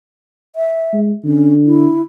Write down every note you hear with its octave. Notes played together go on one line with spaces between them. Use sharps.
E5
G#3
D3 C#4
E4